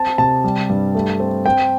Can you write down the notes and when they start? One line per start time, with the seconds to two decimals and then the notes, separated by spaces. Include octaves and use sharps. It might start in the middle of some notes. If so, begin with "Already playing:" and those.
Already playing: C4 A5
0.18 C3 A5
0.44 G3
0.69 G2
0.95 A3
1.20 C4
1.46 C4 G5